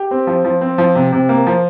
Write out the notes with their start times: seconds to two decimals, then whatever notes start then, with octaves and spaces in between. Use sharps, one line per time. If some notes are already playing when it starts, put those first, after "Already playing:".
Already playing: G4
0.11 C4
0.27 F3
0.44 F3
0.61 C4
0.78 F3
0.95 C3
1.12 C3
1.29 A#3
1.47 F3